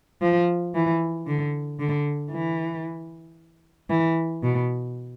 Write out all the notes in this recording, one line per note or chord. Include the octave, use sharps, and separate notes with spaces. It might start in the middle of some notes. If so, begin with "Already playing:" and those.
F3
E3
D3
D3
E3
E3
B2